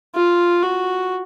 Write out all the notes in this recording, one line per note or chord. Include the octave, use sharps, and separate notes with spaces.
F4
F#4